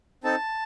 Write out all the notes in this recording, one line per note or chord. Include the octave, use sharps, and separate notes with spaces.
C4 D#4 A4 A5